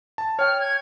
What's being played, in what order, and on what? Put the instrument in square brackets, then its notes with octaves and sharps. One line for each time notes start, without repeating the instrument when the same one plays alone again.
[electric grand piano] A5
[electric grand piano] C#5 G5 [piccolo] F6
[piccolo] G#6